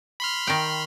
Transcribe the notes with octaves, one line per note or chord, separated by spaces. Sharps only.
B5 C6 F6
D#3 G5